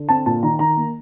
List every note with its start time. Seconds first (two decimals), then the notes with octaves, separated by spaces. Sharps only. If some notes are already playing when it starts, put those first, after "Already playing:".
Already playing: D3
0.09 C4 A5
0.26 A#2 A5
0.43 D#3 A#5
0.59 D#3 A#5
0.77 A#3